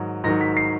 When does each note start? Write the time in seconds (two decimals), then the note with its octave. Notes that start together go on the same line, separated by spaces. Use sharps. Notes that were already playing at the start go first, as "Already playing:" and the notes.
Already playing: G#2 D#3 F#3
0.24 G#2 D#3 F#3 A#6
0.41 B6
0.57 C7